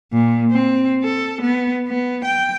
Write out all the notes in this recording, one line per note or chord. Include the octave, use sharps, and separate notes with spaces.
A#2
C4
A4
B3
B3
G5